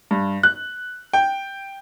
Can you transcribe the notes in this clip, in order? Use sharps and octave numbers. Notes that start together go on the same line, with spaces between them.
G2
F#6
G5